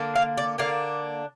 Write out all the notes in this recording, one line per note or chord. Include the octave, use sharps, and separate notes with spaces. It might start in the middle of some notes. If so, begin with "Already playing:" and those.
Already playing: D3 A#3 D4
F5
D5
D3 A#3 D4 F5